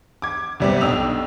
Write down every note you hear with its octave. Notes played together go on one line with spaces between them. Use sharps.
D6 G#6
C2 C3 G3 B3 C4
B1 D4 G5 D#6 E6 F7